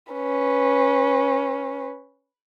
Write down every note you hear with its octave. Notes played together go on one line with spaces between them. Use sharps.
C#4 B4